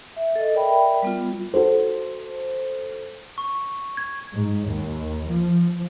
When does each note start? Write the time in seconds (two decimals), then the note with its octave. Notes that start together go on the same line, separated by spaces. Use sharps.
0.16 E5
0.35 A4 D#5
0.54 A#4 D5 E5 G5 B5
1.03 G3 B3 F4
1.54 F#4 A4 C5
3.38 C#6
3.97 G#6
4.36 G#2
4.70 D#2
5.30 F3